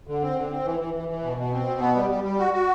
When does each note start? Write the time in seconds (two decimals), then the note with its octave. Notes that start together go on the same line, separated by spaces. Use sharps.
0.07 D3
0.22 C4
0.36 D3
0.51 C4
0.65 E3
0.80 E3
0.94 E3
1.09 E3
1.23 B2
1.38 B2
1.53 C4
1.66 B2
1.80 B3
1.96 G3
2.10 G3
2.24 G3
2.39 F#4
2.53 F#4